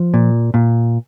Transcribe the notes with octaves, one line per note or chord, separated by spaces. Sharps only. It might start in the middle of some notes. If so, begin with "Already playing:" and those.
Already playing: F3
A#2
A#2